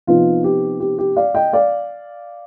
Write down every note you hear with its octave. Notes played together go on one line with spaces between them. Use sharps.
C3 F3 B3 D#4 F4
G4
G4
G4
D5 F5
D#5 G5
D5 F5